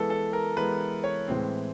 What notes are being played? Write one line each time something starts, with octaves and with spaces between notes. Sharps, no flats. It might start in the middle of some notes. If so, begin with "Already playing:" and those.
Already playing: E3 G#3 B3 A4
A4
A#4
E3 G#3 B3 B4
C#5
A2 E3 G#3 C4